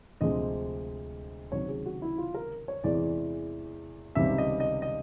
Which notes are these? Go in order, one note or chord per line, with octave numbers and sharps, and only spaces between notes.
D2 C3 F3 G#3 D#5
C#2 C3 D#3 F#3 C#5
G#4
F#4
E4
F4
A#4
C#5
E2 C3 E3 G#3 D5
C#2 C3 D#3 G3 E5
D#5
D#5
D#5